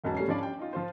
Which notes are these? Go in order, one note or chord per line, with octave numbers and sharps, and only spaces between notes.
E1 B1 F#3 C#4 A5
G3 A3 C#4 C7
F3 C#4 D4 D5 B5
G5
D#4 F4
F3 F4 C5